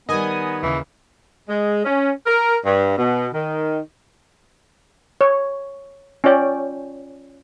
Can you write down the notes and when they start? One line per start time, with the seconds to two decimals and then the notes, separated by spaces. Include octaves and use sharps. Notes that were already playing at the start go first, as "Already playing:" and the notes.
0.09 D#3 G3 B3 D#5 G#5 D#6
0.63 D#2 C#3 E3
1.49 G#3
1.85 C#4
2.27 A#4
2.66 G2
2.97 B2
3.33 D#3
5.21 C#5
6.24 C#4 F4 C#5 D5 G5